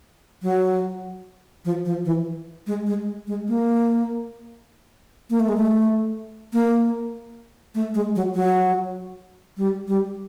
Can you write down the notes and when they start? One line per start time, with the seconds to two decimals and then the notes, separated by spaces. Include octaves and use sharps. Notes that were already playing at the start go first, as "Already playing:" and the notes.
0.43 F#3
1.65 F3
1.85 F3
2.05 E3
2.67 G#3
2.87 G#3
3.27 G#3
3.48 A#3
5.30 A#3
5.40 A3
5.49 G#3
5.57 A3
6.53 A#3
7.75 A3
7.94 G#3
8.16 F#3
8.35 F#3
9.57 G3
9.88 G3